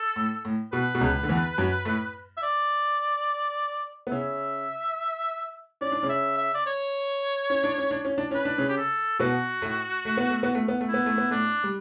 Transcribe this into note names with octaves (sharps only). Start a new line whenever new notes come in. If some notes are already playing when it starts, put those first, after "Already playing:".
Already playing: A4
A2
A2
B2 B4
B2
C#2 C#3
D3
E2 E3
F#2 F#3
A2 A3
E5
D5
B3
C#3 C#4 E5
C#4 D5
D4
C#3 C#4
E5
E5
D5
C#5
C#4
D4
C#4
D4
C#4
D4
C#4 B4
D4
C#3 C#4
G4
A4
B2 B3 F#4
A2 A3
A3
B3
A3
B3
A3
B3
A3
B3 E4
A3
B3
A2 A3 D4
G3